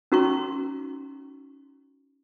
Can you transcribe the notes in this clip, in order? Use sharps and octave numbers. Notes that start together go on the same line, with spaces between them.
C#4 D#4 F#4 A#5 C6 C#6